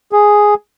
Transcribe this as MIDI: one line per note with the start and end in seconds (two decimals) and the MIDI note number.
0.12 0.54 68